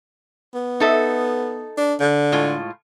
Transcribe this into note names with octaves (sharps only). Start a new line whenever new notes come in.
B3
D#4 A4 E5
D4
D3
A2 G#3 F4